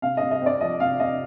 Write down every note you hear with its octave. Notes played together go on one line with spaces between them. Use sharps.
C3 F5
C3 D#5
D#5
C4 D5
F3 D#5
C3 F5
C3 D#5